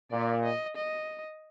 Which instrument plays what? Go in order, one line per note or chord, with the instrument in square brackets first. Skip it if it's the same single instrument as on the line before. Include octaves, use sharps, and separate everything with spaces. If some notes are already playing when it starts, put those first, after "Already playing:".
[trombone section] A#2 [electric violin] D5
[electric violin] D#5
D#5